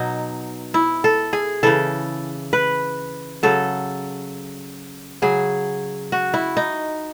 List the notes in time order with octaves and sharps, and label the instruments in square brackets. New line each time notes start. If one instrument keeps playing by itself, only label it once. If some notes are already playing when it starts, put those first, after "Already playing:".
Already playing: [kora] B2 F#3 D#4
E4
A4
G#4
C#3 E3 A4
B4
C#3 F#3 A4
C#3 F#3 G#4
F#4
E4
D#4